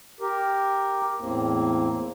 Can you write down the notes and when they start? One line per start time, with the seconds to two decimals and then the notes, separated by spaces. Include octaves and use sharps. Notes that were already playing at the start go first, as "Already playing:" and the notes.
0.20 G4 A#4
1.20 E2 A2 A#3 C4